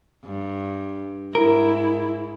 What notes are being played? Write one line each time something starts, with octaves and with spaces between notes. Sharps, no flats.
G2
G#2 E4 A#4